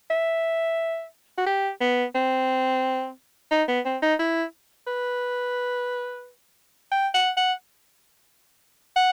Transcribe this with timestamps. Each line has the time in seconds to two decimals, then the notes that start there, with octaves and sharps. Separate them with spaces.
0.10 E5
1.38 F#4
1.46 G4
1.81 B3
2.15 C4
3.51 D#4
3.68 B3
3.85 C4
4.02 D#4
4.19 E4
4.87 B4
6.92 G5
7.14 F#5
7.37 F#5
8.96 F#5